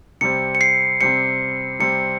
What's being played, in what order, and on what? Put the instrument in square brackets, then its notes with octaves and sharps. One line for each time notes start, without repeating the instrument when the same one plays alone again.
[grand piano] C3 G3 C4 [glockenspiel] C#7
[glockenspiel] C#7
C7
[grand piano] C3 G3 C4 [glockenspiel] C#7
[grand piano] C3 G3 C4 [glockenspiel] C#7